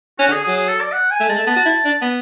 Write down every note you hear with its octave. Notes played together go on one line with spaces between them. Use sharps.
C#4 F#4
D3
G#4
F#3 G#4
G#4
A4
D5
F#5
G#5
A3
G#3 A5
A3
B3 A5
F#4
E4
D4
B3